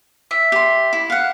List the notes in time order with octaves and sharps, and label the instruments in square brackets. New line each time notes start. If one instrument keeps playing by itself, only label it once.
[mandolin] E5
[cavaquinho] G4 C6
E4
F5 F#5